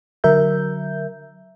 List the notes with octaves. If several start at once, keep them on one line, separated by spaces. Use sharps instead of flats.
D3 F#3 A#4 E5 G6